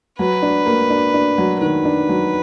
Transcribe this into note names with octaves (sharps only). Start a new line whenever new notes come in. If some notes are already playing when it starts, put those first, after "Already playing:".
F#3 B4
D4
A#3
D4
D4
F#3
D#3 B4
D4
F#3